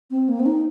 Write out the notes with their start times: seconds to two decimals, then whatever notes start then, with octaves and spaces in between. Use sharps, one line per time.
0.11 C4
0.29 A#3
0.40 C4
0.46 D#4